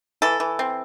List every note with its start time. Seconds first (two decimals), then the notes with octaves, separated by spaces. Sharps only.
0.22 E3 A4
0.40 E3
0.59 C4